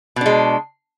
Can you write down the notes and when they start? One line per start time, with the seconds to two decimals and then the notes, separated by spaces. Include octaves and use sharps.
0.16 B2
0.21 D4
0.26 G#3